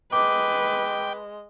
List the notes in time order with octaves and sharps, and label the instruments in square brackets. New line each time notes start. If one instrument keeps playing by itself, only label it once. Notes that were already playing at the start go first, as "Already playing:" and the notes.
[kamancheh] G#3 D#5 [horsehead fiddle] B4 [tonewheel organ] G5 [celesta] D6